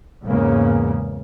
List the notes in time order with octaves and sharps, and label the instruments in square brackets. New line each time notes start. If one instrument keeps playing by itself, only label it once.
[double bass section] E2 G#2 C#3 A#3